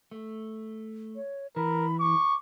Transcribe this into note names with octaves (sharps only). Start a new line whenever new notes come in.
A3
C#5
E3 A#4 B5
C#6 D6